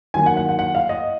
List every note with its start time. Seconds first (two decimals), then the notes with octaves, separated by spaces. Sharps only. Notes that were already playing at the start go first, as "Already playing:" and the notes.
0.14 D#3 F#3 A#3 G#5
0.26 F#5
0.37 F#5
0.49 F#5
0.59 F#5
0.75 F5
0.89 D#5